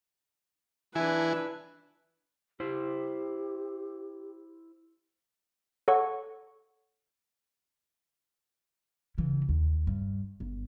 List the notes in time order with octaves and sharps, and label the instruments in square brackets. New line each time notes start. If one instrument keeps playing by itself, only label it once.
[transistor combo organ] E3 E4 G#5 [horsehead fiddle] D4 B4
[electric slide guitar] E4 C5 [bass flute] G4
[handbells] A4 C#5 F#5 C#6
[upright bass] C#3 E3
D#2
G2
G1